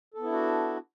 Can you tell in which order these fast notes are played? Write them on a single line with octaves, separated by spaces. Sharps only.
A4 B3 E4 D4 F#4